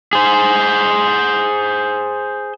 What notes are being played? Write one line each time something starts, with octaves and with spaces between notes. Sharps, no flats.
G#4 C5